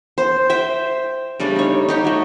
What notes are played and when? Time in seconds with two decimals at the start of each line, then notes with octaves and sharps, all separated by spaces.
0.18 C5
0.50 C5 E5 G5
1.40 C#3 G3 A3 D4
1.56 D#4 C#5
1.89 D#4 G4 C#5
2.05 A3 F#4